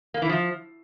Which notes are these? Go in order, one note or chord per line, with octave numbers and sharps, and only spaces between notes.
A#3
E3
F3